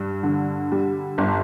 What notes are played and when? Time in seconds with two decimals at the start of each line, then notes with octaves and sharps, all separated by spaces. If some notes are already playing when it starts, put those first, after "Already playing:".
Already playing: G2
0.23 D3
0.72 G3
1.18 G1